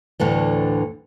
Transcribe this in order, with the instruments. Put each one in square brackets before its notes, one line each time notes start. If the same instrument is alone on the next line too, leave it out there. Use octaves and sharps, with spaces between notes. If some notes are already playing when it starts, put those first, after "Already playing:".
[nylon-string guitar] D2 A2 D3 E3